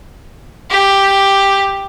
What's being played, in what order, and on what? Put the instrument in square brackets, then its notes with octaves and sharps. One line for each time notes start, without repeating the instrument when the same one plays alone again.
[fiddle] G4